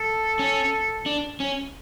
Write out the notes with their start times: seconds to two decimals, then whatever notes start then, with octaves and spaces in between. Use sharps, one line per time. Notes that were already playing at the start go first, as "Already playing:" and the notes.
Already playing: A4
0.39 C#4
1.06 D4
1.40 C#4